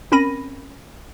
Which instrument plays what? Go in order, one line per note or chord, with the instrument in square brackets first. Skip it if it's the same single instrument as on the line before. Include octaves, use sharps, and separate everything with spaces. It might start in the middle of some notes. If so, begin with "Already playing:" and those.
[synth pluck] C4 C#4 A#4 B5 A#6 D#7